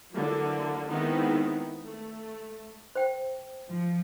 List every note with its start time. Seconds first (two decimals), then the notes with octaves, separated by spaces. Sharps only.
0.13 D3 E3 F#3 A#3
0.89 D#3 G#3 B3 C4 D#4 E4
1.84 A3
2.95 C5 G5
3.68 F3